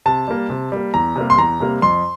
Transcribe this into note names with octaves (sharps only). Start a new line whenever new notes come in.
C3 A5
G3 A#3
C3
G3 A#3
E2 A#5
C3 G3 A#3
C6
E2 A#5
C3 G3 A#3
F2 C6